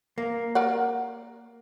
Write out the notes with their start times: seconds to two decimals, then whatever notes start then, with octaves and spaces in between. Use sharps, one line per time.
0.18 A#3
0.55 A#4 D5 F#5